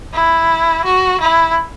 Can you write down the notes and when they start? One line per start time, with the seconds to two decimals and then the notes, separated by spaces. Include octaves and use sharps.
0.14 E4
0.85 F#4
1.20 E4